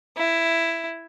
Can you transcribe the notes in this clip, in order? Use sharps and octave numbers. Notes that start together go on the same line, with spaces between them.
E4